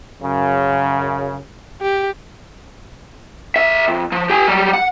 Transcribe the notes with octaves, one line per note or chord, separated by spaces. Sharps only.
F#2 C#3
G4
B1 E5
F2
F3
G4 G#5
F#3 G3
F#5